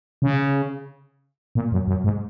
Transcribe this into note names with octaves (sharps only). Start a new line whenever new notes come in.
C#3
A#2
F#2
F#2
G#2